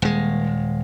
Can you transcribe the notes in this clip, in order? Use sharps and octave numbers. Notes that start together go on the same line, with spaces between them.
D#1 G#3